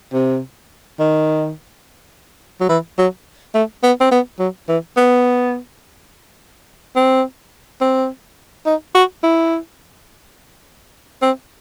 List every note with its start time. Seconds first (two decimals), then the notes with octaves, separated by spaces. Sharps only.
0.13 C3
0.99 D#3
2.61 F#3
2.69 E3
2.98 F#3
3.54 A3
3.83 B3
4.01 C4
4.11 B3
4.39 F#3
4.69 E3
4.97 B3
6.96 C4
7.81 C4
8.66 D#4
8.95 F#4
9.23 E4
11.22 C4